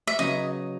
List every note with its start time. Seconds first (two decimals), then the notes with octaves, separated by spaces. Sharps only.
0.07 E5
0.19 C#3 F#3 B3 D#4 D#5